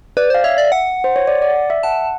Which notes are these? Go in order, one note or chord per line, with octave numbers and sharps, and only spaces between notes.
B4 D5
C5 F5
C#5 E5
D5
F#5
C5
C#5
D5
D5
E5
F#5 A5